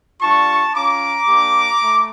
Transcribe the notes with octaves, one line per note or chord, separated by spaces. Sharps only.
G3 D4 F4 A5 C#6
C#4 F4 A#5 D6
A#3 D4 G4
A3